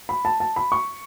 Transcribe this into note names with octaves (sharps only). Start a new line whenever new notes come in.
B5
A5
A5
B5
C#6